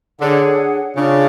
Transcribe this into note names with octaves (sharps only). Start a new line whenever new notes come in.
D3 D4 G#4 C#5 F#5
C#3 D4 F4 G#4